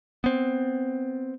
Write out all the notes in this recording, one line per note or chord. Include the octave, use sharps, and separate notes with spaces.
B3 C4